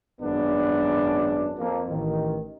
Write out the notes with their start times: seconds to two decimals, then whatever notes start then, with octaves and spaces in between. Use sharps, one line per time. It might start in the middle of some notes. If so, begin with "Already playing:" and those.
0.20 G#1 F#2 B3 D4
1.58 F2 A#3
1.89 A1 D#3